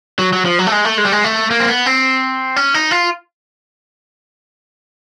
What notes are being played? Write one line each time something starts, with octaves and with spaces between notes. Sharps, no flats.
F#3
F#3
F3
F#3
A3
G#3
A3
G#3
G3
G#3
A3
A#3
C4
B3
C4
C#4
D#4
F4